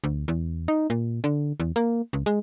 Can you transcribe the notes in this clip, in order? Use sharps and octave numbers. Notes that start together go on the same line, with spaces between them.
D2
E2
D#4
A#2
D3
E2
A#3
C#2
G#3